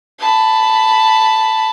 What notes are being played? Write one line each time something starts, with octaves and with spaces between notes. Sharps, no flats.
A5 B5